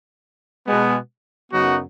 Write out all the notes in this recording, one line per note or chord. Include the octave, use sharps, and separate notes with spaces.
B2 G#3 B3
F#2 C#3 F#3 B3 D#4 F#4